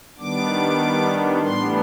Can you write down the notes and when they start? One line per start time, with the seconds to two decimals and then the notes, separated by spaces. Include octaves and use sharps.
0.18 D#3 G3 B3 D4 D6
1.42 A2 E3 G3 B3 D4 C6